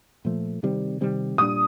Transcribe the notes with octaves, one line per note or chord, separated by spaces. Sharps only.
A#2 F3 A3
C3 D#3 G3 C4
C3 D#3 G3 C4
A#2 G3 D4 D#6